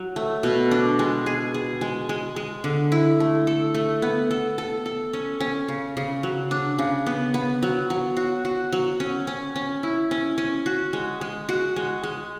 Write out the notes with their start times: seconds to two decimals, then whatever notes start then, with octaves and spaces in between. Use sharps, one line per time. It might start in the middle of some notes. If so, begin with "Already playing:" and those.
Already playing: F#3
0.16 A3
0.43 B2
0.71 D4
0.99 G#3
1.26 G#4
1.54 G#4
1.81 G#3
2.09 G#3
2.36 G#3
2.64 D3
2.92 E4
3.20 A3
3.47 A4
3.74 A3
4.02 B3
4.31 A4
4.58 A4
4.86 A4
5.13 C#4
5.40 C#4
5.68 C#3
5.97 C#3
6.23 F#3
6.51 D4
6.79 C#3
7.06 B3
7.34 B3
7.63 F#3
7.90 F#3
8.17 F#4
8.45 F#4
8.72 F#3
9.00 C#4
9.27 C#4
9.56 C#4
9.83 E4
10.11 C#4
10.38 C#4
10.66 F#4
10.93 G#3
11.21 G#3
11.49 F#4
11.76 G#3
12.03 G#3